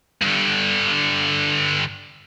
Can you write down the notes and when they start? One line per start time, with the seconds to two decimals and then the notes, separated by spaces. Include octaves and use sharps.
0.21 G2 D3